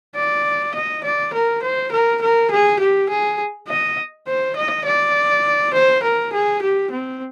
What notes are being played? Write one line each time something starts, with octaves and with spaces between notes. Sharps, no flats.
D5
D#5
D5
A#4
C5
A#4
A#4
G#4
G4
G#4
D#5
C5
D#5
D5
C5
A#4
G#4
G4
C4